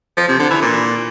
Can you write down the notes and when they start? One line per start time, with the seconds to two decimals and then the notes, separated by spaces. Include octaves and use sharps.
0.17 F3
0.28 C3
0.39 D3
0.50 E3
0.62 A#2